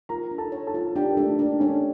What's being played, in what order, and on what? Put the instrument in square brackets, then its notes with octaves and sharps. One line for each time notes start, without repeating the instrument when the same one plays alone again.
[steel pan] F4 [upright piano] A#4 A#5
[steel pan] D4
[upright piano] A4 A5
[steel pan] C#5
[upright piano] A4 A5
[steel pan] F4
[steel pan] D4 [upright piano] G4 G5
[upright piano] A#4
[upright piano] A3 A4 [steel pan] D4
[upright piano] A#3 A#4 [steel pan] D4
[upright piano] C#4 C#5 [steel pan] D4